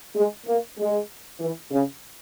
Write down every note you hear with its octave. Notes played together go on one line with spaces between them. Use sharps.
G#3
A#3
G#3
E3
C#3